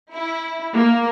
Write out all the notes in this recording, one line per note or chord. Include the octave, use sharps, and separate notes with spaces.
E4
A#3